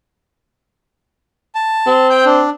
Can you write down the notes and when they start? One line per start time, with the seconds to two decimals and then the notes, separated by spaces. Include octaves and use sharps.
1.55 A5
1.87 C4
2.10 G5 G6
2.26 D4